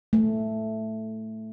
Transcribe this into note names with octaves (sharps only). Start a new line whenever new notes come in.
A3